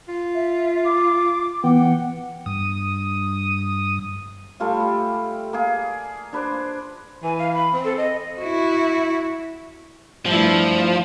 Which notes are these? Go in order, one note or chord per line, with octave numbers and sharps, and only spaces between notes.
F4
E5
D6
E3 B3 F#5 G5
G2 D#6
G3 A3 F4 G#5
G4
A#3 G#4
D4 B4 C5 D5
E3 G#5
F5
B5
C4
A4
D#5
E4 F#4
G2 F3 A3 E4